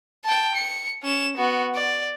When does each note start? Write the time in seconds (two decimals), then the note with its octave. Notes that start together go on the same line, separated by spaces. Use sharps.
0.25 G5 A5
0.55 C#7
1.03 C#4 E7
1.37 B3 F#4
1.75 D5